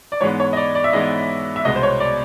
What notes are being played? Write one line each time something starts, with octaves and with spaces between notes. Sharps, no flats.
D5
G#2 E3 G#3 B3 C#5
C#5
D#5
D5
D5
E5
G#2 E3 G#3 B3 D#5
E5
C2 B2 G#3 B3 D#5
C5
C#5
D5